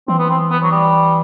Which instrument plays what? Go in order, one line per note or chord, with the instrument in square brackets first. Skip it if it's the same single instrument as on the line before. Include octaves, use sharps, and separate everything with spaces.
[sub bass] E3 [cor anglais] C4
[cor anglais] B3
C4
B3
F#3
G3